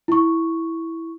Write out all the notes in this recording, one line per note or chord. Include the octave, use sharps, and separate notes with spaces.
E4 C#6